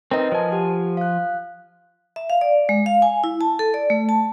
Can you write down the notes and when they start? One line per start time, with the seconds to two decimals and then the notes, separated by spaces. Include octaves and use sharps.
0.11 C4 D#4 A#4 B4 D#5
0.32 F3 C5 G#5 A5
0.52 G4 F#5
0.97 F5 F#6
2.16 E5
2.30 F5
2.41 D5
2.69 G#3
2.86 F5
3.02 G#5
3.24 E4
3.41 A5
3.59 A4
3.74 D5
3.90 A3
4.09 A5